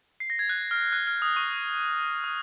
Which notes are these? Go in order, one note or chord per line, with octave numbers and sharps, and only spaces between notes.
C7
A#6
G#6
F#6
F6
F#6
F6
D#6
C#6
D#6